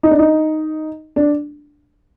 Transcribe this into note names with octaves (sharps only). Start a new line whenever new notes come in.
D#4
D4
D#4
D4